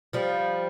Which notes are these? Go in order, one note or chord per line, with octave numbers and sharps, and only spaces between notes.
F3 G3